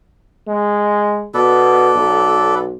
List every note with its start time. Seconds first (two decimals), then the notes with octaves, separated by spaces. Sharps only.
0.48 G#3
1.34 B2 A4 B4 D5
1.96 B1